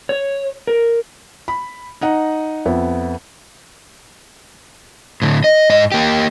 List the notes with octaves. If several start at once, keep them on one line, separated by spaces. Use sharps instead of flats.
C#5
A#4
B5
D#4 D#5 F#5 A#5
F2 B3 E5
A2 D3
D#5
G#2 D#5
A#3 G4